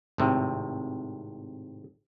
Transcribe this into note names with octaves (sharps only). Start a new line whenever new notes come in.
G#1 A2 C3